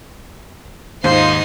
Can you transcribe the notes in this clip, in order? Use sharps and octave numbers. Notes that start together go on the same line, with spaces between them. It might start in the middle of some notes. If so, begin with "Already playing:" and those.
D#2 G#2 D#4 F4 C5 C6